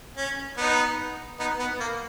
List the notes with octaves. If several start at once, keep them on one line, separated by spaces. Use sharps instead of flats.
C#4
B3 D#4
B3 D#4
B3
A#3